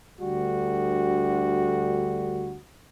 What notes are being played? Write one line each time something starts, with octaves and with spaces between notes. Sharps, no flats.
D2 D3 G3 F#4